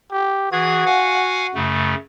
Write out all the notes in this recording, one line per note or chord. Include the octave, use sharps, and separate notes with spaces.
G4
E3 F#4 G#4 G#6
F5 F#5 G#5
F#2 C#3 A3